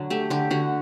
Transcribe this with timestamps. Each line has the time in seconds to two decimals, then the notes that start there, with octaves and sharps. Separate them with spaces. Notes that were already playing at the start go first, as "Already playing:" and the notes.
Already playing: D3 F#3
0.10 A3 G4
0.30 D3 G4
0.51 D3 F#4